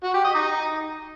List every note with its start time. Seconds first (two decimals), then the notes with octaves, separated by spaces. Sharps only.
0.04 F#4
0.14 G4
0.24 D#5
0.35 D#4